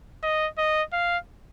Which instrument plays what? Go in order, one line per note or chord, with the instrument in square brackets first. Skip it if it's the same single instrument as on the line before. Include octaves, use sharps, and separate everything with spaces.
[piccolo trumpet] D#5
D#5
F5